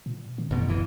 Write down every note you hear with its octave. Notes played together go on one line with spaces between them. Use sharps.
A#2
D#3
A1 F#2 B2
D1 E3